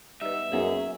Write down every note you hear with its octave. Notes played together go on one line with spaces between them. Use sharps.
G3 B3 D#4 E5
F#2 A#3 B3 D#4 G#4